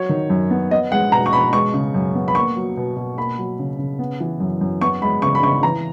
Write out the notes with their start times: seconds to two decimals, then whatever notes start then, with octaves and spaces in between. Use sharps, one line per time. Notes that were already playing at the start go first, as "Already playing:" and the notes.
Already playing: F#3 C#5
0.09 D#3
0.30 F#2
0.50 B3
0.71 B3 D#5
0.92 G#3 F#5
1.12 B2 A#5
1.26 C#6
1.33 B2 B5
1.53 G#3 C#6
1.74 C#3
1.94 F#2
2.15 B3
2.28 B5
2.35 A#3 C#6
2.56 F#3
2.77 B2
2.96 B2
3.17 A#3 B5
3.38 F#3
3.59 C#3
3.78 C#3
3.99 B3
4.20 E3
4.40 F#2
4.61 F#2
4.81 B3 C#6
5.02 G#3 B5
5.22 C#3 C#6
5.35 B5
5.43 C#3 C#6
5.63 E3 A#5